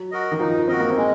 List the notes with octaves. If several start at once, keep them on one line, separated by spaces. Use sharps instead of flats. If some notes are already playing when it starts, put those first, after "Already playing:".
Already playing: F#3
F#4 A#4 D#5
D#3
F3 D#4
C4 F#4 A#4 D#5
A#3
G#3 C4